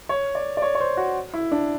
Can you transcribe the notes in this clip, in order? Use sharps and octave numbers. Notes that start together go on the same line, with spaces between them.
C#5
D5
D5
C#5
C#5
C5
F#4
E4
D4